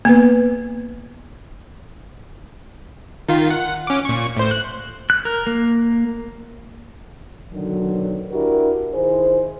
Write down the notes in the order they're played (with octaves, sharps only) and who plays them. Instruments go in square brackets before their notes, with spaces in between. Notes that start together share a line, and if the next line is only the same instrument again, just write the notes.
[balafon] A#3 B3 B4
[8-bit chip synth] D#3 F4
F#5
C#4 D6
A#2 C#6
A2 C5
F#6
[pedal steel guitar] F#6
A#4
A#3
[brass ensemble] B2 D3 D#3 F#3
D4 E4 F#4 G4 A#4
D#3 E4 G#4 C5